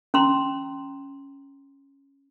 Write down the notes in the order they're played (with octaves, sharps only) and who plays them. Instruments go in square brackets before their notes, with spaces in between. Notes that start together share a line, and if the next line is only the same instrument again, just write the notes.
[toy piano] C#4 A#5 C6